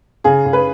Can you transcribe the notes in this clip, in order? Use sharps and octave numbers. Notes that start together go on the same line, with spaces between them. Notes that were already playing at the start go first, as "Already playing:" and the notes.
C#3 G#4
C#3
B4